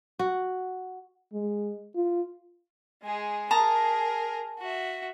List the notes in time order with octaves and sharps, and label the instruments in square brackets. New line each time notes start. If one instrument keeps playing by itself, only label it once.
[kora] F#4
[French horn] G#3
F4
[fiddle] G#3 G#4
[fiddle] G#4 A#4 [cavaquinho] A5 A#5 D#6
[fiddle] F#4 E5